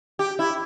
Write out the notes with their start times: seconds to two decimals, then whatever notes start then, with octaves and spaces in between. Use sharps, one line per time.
0.19 G4
0.39 E4